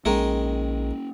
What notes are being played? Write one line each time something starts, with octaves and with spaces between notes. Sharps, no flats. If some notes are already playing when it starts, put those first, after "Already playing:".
A#1 D#3 G#3 A#3 C#4 D#4